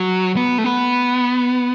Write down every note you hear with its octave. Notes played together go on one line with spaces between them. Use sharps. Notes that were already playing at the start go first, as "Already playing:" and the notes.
Already playing: F#3
B3
A3
B3